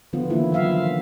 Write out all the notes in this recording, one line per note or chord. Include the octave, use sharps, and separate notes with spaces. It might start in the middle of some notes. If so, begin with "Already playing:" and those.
D3 F3 B3 F4
D#3 E3 A#3 E4
F3 F#3 E5 F5